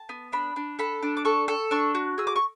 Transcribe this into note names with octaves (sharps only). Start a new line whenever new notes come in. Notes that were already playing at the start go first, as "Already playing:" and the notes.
Already playing: A5
B3
D4 B5
D4
A4 B5
D4
D6
A4 C#6
A4
D4 C#6
F#4
G#4 E6
D6
C#6